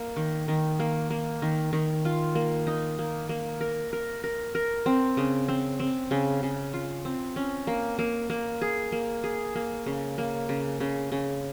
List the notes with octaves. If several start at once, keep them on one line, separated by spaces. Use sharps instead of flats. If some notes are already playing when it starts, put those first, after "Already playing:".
Already playing: A#3
D#3
D#3
A#3
A#3
D#3
D#3
F4
A#3
D#4
A#3
A#3
A#4
A#4
A#4
A#4
C4
C#3
C4
C4
C#3
C#3
F4
C4
C#4
A#3
A#3
A#3
G#4
A#3
G#4
A#3
C#3
A#3
C#3
C#3
C#3